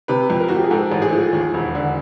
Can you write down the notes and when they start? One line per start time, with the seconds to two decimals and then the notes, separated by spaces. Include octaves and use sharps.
0.08 C3 B4
0.30 F2
0.40 A#4
0.48 F3 F#4
0.56 G4
0.64 G#4
0.71 G#2 A4
0.92 A1
1.02 G#4
1.12 F3
1.33 D#2
1.54 E1
1.75 D3